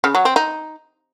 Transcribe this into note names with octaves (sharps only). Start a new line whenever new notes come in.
C#3
F#3
C4
D#4